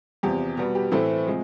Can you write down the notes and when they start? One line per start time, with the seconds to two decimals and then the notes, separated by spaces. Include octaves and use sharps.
0.23 E2 C3 F3 G4
0.57 B2 G3 B3 F#4
0.75 G4
0.91 A2 E3 A3 C4
1.27 C3 F3 G#3